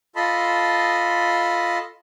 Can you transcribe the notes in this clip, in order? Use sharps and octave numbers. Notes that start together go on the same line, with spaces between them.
F4 A4 D#5 A5 B5 C6